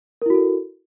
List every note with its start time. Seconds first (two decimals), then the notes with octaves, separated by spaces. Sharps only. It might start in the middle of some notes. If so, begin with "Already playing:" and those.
0.22 A#4
0.26 E4
0.30 F#4
0.34 A4